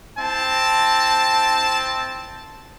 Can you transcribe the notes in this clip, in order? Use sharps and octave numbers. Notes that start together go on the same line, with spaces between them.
C4 E4 A5